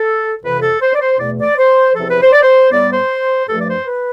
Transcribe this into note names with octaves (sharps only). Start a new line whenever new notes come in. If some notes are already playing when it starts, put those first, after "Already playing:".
Already playing: A4
F2 C3 E3 B4
A4
C5
D5
C5
E2 B2 A3 D5
D5
C5
E2 C3 F3 A4
B4
C5
D5
C5
A2 G3 B3 D5
C5
G2 F3 A3 A4
D5
C5
B4